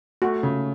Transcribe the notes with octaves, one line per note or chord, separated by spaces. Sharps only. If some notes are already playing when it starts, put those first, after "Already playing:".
A3 F#4
C#3